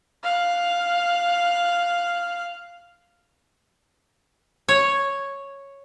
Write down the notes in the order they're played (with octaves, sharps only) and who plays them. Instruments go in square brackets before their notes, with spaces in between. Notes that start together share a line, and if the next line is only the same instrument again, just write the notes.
[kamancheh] F5 F#6
[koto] C#5